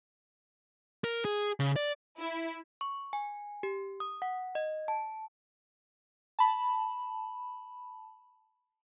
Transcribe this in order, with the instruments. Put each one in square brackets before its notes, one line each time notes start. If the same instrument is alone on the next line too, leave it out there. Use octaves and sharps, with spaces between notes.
[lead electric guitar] A#4
G#4
C#3
D5
[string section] E4
[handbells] C#6
G#5
G4
D#6
F#5
D#5
A5
[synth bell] A5 B5